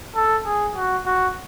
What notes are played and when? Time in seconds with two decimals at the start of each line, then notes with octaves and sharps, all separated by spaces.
0.16 A4
0.46 G#4
0.76 F#4
1.06 F#4